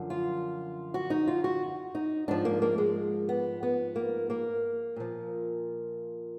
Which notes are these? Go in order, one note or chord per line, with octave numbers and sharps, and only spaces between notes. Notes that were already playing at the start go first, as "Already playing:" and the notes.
Already playing: F#2 D3 F3
F4
F#4
D#4
F4
F#4
D#4
G#2 F3 D4
A#3
A#3
G#3
B3
B3
A#3
A#3
A#2 F3